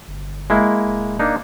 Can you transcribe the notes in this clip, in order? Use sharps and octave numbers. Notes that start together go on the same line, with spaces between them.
G1
G#3 A#3 E4
D1
A#3 D4 D#4